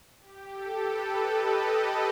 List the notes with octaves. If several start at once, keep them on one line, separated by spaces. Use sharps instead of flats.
G4
A4
B4
D#5
D#5